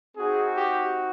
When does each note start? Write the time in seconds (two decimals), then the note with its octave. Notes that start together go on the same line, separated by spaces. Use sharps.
0.16 C4 D#4 F#4 G#4
0.57 G4